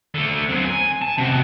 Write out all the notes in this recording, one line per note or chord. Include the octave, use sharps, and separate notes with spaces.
D3 A3
F#3 C4
G#5
A5
C3 F#4